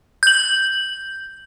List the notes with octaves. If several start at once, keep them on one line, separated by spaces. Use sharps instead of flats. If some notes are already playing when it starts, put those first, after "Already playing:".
G6 F#7